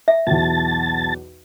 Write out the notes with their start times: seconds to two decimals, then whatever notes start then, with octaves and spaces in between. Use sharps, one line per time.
0.08 E5
0.27 B1 E2 A5